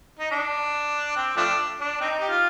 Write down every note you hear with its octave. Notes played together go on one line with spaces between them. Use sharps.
D#4
D4
C4
F3 A3 D4
D4
C4 D#4
G4
F4